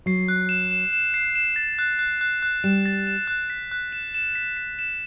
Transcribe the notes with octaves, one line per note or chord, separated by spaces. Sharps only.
F#3 C7
F#6
E7
E7
E7
C7
E7
A6
F#6
F#6
F#6
F#6
G3 E7
A6
E7
F#6
B6
F#6
E7
E7
B6
B6
E7